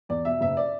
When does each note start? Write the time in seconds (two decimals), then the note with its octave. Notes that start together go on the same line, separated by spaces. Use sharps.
0.09 E2 D5
0.25 B2 E5
0.41 F#1 E5
0.57 D5